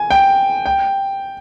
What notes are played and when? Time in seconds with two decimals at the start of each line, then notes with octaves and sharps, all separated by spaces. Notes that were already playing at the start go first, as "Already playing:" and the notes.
Already playing: G#5
0.10 G5
0.66 G5